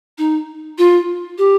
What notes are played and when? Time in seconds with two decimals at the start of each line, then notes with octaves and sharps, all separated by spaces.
0.18 D#4
0.78 F4
1.38 G4